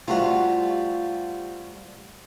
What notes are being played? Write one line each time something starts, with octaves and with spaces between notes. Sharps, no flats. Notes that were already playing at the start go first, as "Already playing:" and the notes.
C3 G3 A3 F4 F#4